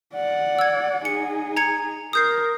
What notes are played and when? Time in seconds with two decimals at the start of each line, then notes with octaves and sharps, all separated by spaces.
0.14 D5 F#5
0.59 E6 G#6
1.05 D#4 G#4 C#7
1.57 A#5 G#6 C#7
2.13 A#4 D#6 G6 C7